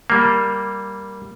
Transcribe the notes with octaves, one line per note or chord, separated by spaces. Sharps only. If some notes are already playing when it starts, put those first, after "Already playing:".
G3 A#3